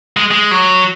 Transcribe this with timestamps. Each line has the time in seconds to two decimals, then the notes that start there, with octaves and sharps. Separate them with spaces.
0.17 G#3
0.31 G#3
0.51 F#3